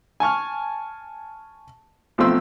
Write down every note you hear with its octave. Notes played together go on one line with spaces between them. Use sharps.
G#5 A5 C#6 F6
B1 F3 A3 C4 C6 E6